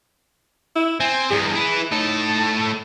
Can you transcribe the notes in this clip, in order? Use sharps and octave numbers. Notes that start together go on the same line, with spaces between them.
E4
C4 G#5
E2 G2 G#4
E4 B4
A2 D#4 A4